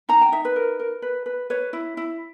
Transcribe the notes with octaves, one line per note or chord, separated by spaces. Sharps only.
D#4 A#5
G5
D#4 E5
B4
A#4
A#4
B4
B4
B4 C#5
E4
E4